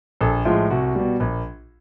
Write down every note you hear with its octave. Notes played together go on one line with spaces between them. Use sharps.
A#1 A4
A2 F3 G#3 F4
C2 F#4
B2 G3
A#1